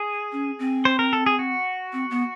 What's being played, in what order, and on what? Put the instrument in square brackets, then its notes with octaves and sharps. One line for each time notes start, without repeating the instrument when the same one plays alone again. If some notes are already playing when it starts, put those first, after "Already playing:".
Already playing: [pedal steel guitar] G#4
[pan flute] C#4
C4
[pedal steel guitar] C5
A#4
A4
G#4
F#4
[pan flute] C4
B3